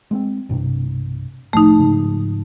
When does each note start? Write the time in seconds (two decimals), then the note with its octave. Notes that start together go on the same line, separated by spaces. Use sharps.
0.11 G#3 A#3 C4
0.49 B1 G2 C3
1.53 C2 A2 F3 A3 D#4
1.79 G#2 C#3 F3